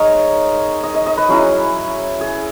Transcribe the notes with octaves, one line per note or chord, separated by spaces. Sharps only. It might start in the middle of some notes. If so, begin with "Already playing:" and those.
Already playing: G#3 D#4 A#4 C#5 D#5
D#5
D#5
D#5
B4
F#3 C#4 E4 G#4
G#4